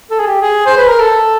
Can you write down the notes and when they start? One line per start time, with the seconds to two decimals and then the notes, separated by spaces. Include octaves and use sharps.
0.11 A4
0.20 G#4
0.27 G4
0.42 G#4
0.66 C5
0.77 B4
0.88 A#4
0.99 A4